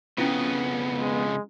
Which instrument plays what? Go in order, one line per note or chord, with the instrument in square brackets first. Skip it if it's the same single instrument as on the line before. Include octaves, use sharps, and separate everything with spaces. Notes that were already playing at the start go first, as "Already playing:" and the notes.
[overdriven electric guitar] F2 C#3 [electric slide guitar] B3 [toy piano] C#4 E4 F4
[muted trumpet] G#3